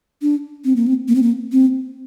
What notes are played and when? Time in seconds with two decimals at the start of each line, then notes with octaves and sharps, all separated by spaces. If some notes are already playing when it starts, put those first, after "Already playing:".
0.22 D4
0.65 C4
0.76 A#3
0.87 C4
1.08 A#3
1.15 C4
1.23 A#3
1.52 C4